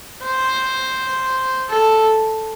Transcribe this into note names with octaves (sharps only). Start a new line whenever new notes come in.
C5
A4